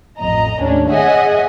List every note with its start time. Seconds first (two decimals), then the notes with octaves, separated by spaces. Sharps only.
0.20 A1 F2 D#5 A#5
0.59 D#2 A2 C#4 D4
0.90 G#4 C#5 D#5 E5 F#5 G#5